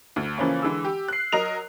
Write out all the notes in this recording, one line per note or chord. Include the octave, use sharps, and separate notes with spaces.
D2
C#3 E3 F3 A#3 C#4
D3 E3 G#3 E6
G4
F#6 C7
F#3 A#4 D#5 F7